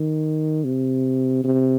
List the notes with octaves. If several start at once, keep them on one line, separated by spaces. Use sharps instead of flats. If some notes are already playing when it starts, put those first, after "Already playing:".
Already playing: D#3
C3
C3